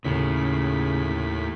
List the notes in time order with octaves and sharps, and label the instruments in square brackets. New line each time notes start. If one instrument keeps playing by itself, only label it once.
[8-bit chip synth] D#2 A2 B6 [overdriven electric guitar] C#3